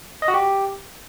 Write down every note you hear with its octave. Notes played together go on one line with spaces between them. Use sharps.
D#5
F#4
G4